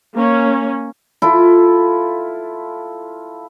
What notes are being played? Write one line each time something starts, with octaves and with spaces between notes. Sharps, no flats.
A#3 C#4
E4 F4 A4